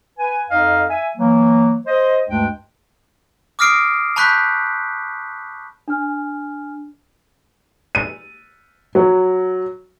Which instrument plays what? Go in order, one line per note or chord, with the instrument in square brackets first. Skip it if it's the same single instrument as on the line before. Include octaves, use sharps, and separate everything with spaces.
[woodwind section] B4 G#5
F2 D#4 D#5 F5
E5 G#5
E3 F#3 A#3
C5 D#5
D2 G2 G#3 D4 G5
[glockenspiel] D6 D#6 F6 A#6 C7 D7
A5 B5 C#6 F#6 G6 B6
[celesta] D4 G#5 F6
[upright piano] D#7
F#3